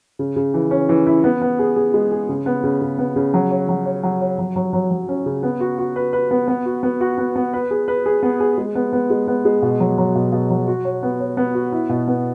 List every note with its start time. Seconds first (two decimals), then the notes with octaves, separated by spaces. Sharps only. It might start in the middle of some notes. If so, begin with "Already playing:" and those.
0.19 C#3
0.36 C#3
0.54 E3
0.71 C#4
0.89 E3
1.07 E4
1.24 B3
1.42 B3
1.59 G#4
1.76 G#4
1.94 G#3
2.12 G#4
2.29 C#3
2.46 B3
2.63 C#3
2.81 C#3
2.99 B3
3.16 C#3
3.34 F#3
3.51 C#5
3.69 F#3
3.86 C#5
4.03 F#3
4.21 C#5
4.38 F#3
4.56 F#3
4.73 F#3
4.91 F#3
5.08 C#4
5.26 C#3
5.43 B3
5.61 F#4
5.78 F#4
5.96 B4
6.13 B4
6.31 B3
6.48 B3
6.66 F#4
6.83 B3
7.01 F#4
7.18 B3
7.36 B3
7.53 B4
7.71 G#4
7.88 B4
8.06 G#4
8.23 B3
8.40 G#4
8.58 G#3
8.75 B3
8.93 B3
9.10 G#3
9.28 B3
9.45 G#3
9.62 B2
9.80 F#3
9.98 F#3
10.15 B2
10.32 B2
10.50 F#3
10.67 F#4
10.85 C#5
11.03 B3
11.20 C#5
11.37 B3
11.55 F#4
11.72 E4
11.89 B2
12.08 B3